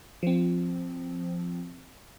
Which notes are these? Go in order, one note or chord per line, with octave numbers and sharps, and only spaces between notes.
F3 C4